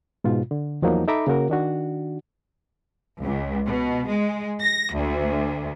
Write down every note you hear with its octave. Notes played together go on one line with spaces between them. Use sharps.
G#2 B2 F4
D3
E2 F3 F#3 A#3 D#4
D#4 A4 E5 A#5 B5 D6
C#3 A#3 F#4 A#4
D#3 D4 F#4
C#2
B2
G#3
A#6
D2